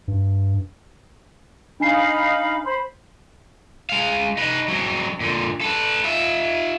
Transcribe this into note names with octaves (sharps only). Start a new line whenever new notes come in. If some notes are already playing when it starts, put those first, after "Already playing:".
G2
D4 D#4 F5 G#5 B5 C7
C5 B5
G#3 F5
D#4 B4
F#3 C4
A#2 D3
A4 B4
F4 E5